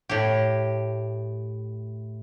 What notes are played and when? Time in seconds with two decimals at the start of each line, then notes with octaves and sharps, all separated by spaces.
0.09 A2 G4